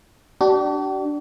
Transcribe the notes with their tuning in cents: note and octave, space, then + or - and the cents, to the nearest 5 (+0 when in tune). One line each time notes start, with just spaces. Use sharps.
D4 +0 G4 -45